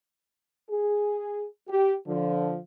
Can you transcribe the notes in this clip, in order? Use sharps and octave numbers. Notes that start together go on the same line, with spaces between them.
G#4
G4
D3 F3